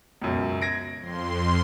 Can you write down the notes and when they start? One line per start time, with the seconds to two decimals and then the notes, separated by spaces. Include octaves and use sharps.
0.21 C#2 F#2 B2
0.62 G#6 A#6 D7
0.99 F2 C6